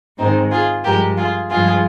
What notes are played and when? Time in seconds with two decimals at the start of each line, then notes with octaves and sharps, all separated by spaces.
0.18 G#2 D#3 G#3 C4 D#4
0.51 F4 G#4
0.84 G2 F3 G#3 G4 A#4
1.17 F4 G#4
1.50 G2 F3 G#3 F4 G#4